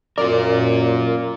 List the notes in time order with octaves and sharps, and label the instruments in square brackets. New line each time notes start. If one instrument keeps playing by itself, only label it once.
[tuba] F#2 [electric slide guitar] F4 A#4 [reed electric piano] D5